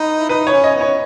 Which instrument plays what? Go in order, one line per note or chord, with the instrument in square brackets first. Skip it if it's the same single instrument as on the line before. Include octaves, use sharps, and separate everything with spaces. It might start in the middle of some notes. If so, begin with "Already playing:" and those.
Already playing: [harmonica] D#4 [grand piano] B4
[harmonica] E4
[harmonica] D#4 [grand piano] B4
[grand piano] C#5
[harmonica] C#4
[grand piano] D#5
[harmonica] B3
[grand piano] C#5